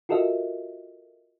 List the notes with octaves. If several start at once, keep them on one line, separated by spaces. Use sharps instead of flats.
F4 F#4 A4 A#4 D#5 E5